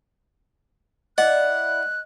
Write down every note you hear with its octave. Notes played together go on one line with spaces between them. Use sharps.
E4 D5 D#5 F#5 F#6